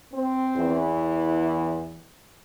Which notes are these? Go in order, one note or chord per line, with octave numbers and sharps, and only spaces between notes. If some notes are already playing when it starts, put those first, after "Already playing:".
C4
E2 E3